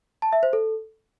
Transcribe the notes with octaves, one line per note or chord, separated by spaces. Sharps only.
A5
E5
C5
A4